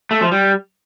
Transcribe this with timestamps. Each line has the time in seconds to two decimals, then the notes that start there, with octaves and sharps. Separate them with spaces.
0.11 A3
0.21 F3
0.32 G3